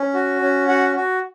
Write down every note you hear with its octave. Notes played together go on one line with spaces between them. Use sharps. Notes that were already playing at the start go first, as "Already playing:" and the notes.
Already playing: C#4
F#4
C#4
F#4 F#5
F#4